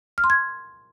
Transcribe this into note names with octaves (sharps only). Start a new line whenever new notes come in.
F6
C6
G#6